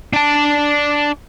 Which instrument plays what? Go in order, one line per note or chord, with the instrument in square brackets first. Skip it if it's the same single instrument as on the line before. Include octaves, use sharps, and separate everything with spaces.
[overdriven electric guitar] D4 A5